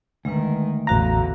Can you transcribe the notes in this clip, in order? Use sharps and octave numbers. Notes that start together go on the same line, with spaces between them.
D2 D#3 G#3 B4
A1 E2 D3 F#4 F5 A#5